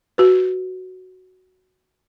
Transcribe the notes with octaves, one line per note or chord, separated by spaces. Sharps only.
F#4 B4